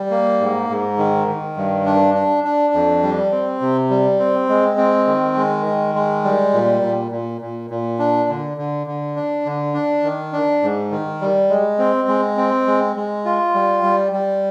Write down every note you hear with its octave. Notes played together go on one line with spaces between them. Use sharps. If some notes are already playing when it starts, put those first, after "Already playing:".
Already playing: G3
A#3
G#2
G#2
D#3
D#3
G2
D4
D4
D4
F2
G3
C4
C3
G3
C4
G#3
C4
D#3
G#3
D#3
G#3
G3
A#2
A#2
A#2
A#2
A#2
D4
D3
D3
D3
D4
D3
D4
D#3
D4
G#2
D#3
G3
G#3
C4
G#3
C4
G#3
G#3
F4
G3
G3
G3